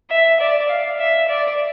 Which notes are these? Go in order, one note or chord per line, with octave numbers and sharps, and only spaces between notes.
E5
D5
F5
E5
D5